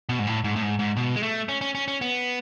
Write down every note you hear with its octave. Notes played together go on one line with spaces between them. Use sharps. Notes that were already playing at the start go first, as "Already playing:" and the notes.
B2
G#2
A2
G#2
A2
G#2
G#2
B2
G#3
A3
C#4
C#4
C#4
C#4
B3